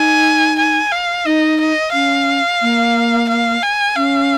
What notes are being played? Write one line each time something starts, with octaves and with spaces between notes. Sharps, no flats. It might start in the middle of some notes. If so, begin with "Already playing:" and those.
Already playing: D#4 G#5
G#5
F5
D#4 D#5
D#5
C#4 F5
A#3
F5
G#5
C#4 F5